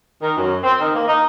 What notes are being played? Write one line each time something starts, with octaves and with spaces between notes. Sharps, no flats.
D#3
F#2
C4
D#3
A#3
D#4